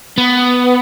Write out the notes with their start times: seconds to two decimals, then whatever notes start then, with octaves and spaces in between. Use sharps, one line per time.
0.18 B3